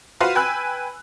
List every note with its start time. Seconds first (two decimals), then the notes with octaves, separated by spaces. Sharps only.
0.21 F4 F#4 B4 C5 F5
0.35 B4 G5 G#5 B5 E6 F#6